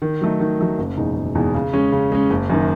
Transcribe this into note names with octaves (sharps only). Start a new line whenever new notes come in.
D#3
F#3 A3 D#4
D#3
F#3 A3 D#4
F#1
E2 B2 G#3 D#4
F#1
E2 B2 G#3 D#4
C#3
G#3 C#4
C#3
G#3 C#4
F#1
F#2 D#3